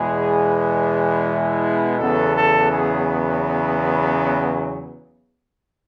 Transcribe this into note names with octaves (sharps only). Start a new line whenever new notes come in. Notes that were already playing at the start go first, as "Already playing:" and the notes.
Already playing: E2 B2 G#3 B3 G#4
E4
E2 C#3 F#3 B3 A4
A4
G#4